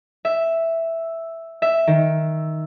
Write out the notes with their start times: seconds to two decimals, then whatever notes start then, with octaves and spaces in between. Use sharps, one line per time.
0.25 E5
1.62 E5
1.87 D#3